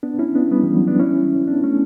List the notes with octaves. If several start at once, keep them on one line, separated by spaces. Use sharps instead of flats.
B3 D4
C#4 E4
B3 D4
G3 B3
E3 G3
F#3
B3 D4
C#4 E4
B3 D4
A3 C#4